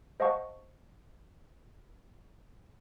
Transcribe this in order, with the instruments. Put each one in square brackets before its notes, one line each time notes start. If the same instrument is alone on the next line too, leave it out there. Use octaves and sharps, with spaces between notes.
[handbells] C5 D#5 F5 F#5 A5 C#6